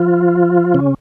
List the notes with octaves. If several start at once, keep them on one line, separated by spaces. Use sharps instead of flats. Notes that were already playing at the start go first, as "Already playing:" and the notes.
Already playing: F3 F4
C#3 C#4